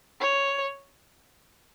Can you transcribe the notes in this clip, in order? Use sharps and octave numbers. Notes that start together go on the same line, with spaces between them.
C#5